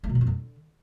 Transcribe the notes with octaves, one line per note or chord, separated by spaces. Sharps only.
A3
B2
D3
F2
D3